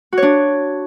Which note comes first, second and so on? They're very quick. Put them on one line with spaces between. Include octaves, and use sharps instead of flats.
F#4 C#5 D4